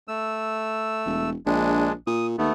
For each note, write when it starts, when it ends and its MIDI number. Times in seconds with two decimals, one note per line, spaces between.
0.08 1.30 57
0.08 1.30 88
1.06 1.35 28
1.46 1.92 34
1.46 1.92 56
1.46 1.92 62
2.07 2.34 46
2.07 2.27 87
2.38 2.50 39
2.38 2.53 57
2.38 2.53 59